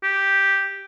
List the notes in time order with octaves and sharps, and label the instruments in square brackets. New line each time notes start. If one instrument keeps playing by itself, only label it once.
[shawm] G4